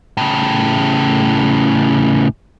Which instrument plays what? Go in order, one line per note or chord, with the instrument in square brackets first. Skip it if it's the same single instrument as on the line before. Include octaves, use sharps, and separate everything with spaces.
[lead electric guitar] A2 C#3